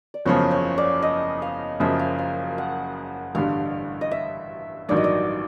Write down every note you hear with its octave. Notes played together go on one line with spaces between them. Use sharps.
D5
F#1 E2 C#3 F3 C#5
C#5
D5
D#5
F5
F#1 F#2 C#3 F3 E5
F5
F5
F#5
A1 G2 D3 G3 F5
D#5
E5
A1 G2 D#3 F#3 D5
D#5
D5